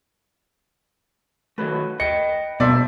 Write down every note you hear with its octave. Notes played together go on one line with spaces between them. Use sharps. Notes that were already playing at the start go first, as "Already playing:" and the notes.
D#3 F#3 A3 B4
D#5 G5 C#7
B2 G3 A#3 B3 C5 D5 E5 A5